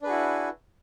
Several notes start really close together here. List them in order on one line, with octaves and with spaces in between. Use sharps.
D4 B4 G#4 F#4 E4